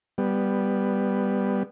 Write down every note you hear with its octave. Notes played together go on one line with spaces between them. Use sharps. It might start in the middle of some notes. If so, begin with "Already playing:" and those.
G3 B3